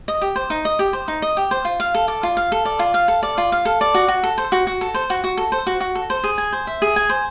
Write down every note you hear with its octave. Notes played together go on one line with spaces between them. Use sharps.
D#5
G4
C5
D#4
D#5
G4
C5
D#4
D#5
G4
C5
F4
F5
A4
D5
F4
F5
A4
D5
F4
F5
A4
D5
F4
F5
A4
D5
F#4
F#4
A4
C5
F#4
F#4
A4
C5
F#4
F#4
A4
C5
F#4
F#4
A4
C5
G#4
G#5
C5
E5
G#4
G#5
C5